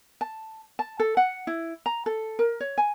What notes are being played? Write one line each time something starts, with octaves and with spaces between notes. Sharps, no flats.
A5
A5
A4
F#5
E4
A#5
A4
A#4
C#5
G#5